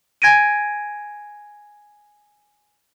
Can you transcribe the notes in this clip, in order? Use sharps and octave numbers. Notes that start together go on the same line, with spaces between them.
G#5 G#6 A#6 D7 D#7